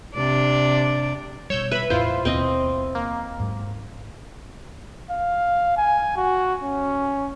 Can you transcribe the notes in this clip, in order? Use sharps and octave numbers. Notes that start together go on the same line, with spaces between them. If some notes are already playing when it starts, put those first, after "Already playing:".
C3 D4 D5
B2 G3 C#5 E6 G6
B4 E5 B5
A1 E2 A2 E4 F4 C5
D#2 B2 C4 D#5
A#3
G#2 F#3
F5
G#5
F#4
C#4